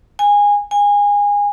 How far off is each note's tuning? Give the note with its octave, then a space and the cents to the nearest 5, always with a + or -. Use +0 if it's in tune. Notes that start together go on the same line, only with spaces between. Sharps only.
G#5 -20
G#5 -25